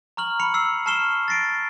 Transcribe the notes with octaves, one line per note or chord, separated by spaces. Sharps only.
A#5 C#6 F6 F#7
B5 C#7 F7
E6 C7
A5 C#6 F6 C7 E7 G7
A6 A#6 C7 D7